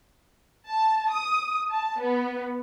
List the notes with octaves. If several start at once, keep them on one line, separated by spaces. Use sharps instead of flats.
A5
D#6
A5
B3